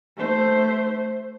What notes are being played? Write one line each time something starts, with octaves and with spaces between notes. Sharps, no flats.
A3 C5